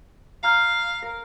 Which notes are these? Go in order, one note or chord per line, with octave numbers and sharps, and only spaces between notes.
F5 A#5 F6 G6
A#4